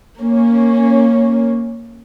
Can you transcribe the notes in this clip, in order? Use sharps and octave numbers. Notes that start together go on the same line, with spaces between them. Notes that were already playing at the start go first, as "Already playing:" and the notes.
A#3 C#4